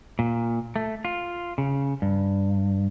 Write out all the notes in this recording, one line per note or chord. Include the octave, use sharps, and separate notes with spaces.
A#2
A3
F4
C#3
G2